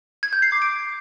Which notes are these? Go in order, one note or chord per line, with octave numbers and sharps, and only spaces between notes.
G#6
G6
C7
D6
D7